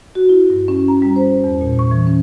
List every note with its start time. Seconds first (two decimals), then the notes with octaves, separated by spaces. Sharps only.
0.15 F#4
0.29 E4
0.50 G2
0.68 C#4
0.88 A#5
1.02 G3
1.16 C5
1.44 E2
1.61 A#2
1.79 C#6
1.91 E3
2.07 C#4